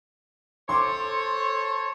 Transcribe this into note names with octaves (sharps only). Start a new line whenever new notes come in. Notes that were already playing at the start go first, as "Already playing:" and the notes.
A4 C5 C#5 C6 D6